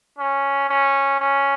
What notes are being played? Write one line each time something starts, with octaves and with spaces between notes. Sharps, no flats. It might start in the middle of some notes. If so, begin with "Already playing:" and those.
C#4
C#4
C#4